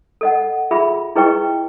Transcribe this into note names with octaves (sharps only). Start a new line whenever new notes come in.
A4 D#5 F#5
F4 G#4 E5 B5
E4 G#4 B4 D#5 G5 C#6